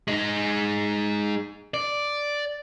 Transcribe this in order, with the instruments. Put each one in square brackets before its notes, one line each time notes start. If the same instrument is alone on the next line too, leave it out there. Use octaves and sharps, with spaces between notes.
[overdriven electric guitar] G#3 D#4
D5